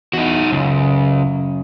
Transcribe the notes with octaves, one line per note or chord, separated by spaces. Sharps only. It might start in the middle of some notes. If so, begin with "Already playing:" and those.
E2 D#4 F#4
C#2 F#2 C#3